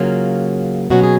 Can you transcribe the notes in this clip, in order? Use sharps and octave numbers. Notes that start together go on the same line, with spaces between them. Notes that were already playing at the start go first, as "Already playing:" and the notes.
Already playing: C#3 F#3 A#3 F4
B2 F#3 C#4 F#4
G#4